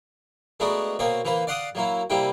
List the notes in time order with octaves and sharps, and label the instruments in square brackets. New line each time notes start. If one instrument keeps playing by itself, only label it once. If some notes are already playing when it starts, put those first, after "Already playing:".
[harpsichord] G#3 A3 B3 D4 F#4 A#4
B2 A#3 C4 C#5
E3 A#3 B4 C5
D5 F5 F#5 C6 D6 D#6
F#3 A#3 E4
C3 G3 A#3 E4 G5